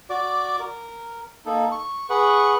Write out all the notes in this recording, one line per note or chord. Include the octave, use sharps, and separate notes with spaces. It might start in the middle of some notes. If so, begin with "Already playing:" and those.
F#4 D5 D6
A#4
A#3 D#4 A4
C#6
G#4 B4 F#5 C#6